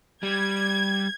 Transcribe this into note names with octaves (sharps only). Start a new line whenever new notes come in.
G3 G#6